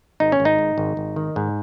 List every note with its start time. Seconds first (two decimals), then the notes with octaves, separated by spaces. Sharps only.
0.20 G#1 D#4
0.32 C#4
0.40 G#1
0.45 D#4
0.59 G#2
0.78 G#1
0.97 G#1
1.16 D#3
1.36 G#2